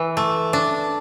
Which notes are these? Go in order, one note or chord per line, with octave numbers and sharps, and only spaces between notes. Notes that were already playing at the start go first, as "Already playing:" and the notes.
Already playing: E3
A3
D4